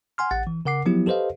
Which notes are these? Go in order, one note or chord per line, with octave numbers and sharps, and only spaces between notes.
F#5 G#5 C6 F6
A1 F#5 A6
E3
C#3 A#4 F#5 D6 C7
F3 F#3 B3 E4 G4
G4 A4 B4 C5 D#5 F5